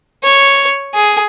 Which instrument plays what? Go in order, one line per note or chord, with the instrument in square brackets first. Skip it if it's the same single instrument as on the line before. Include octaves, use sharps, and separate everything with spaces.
[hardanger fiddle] C#5
G#4